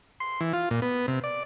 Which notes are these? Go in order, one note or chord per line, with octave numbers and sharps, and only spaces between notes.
C6
E3
F4
A#2
B3
C3
D5